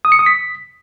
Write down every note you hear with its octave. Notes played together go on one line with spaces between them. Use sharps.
D#6
C#7
D#6
B6